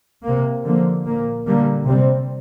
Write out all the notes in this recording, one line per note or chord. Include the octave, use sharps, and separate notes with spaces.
C3 A#3
D3 F3 A#3
A#2 A#3
D3 G3 A#3
C3 G3 C4